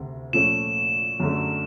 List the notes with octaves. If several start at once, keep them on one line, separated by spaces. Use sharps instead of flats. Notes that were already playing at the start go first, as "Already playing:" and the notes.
Already playing: D2 C3
A#2 F3 A3 C#4 E7
F#2 D3 F#3 A3